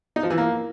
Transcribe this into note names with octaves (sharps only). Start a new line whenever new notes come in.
D#4
F3
E3
A#3